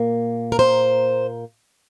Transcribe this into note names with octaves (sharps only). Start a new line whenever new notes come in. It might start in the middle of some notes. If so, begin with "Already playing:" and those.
Already playing: A#2 A#3
A#4
C5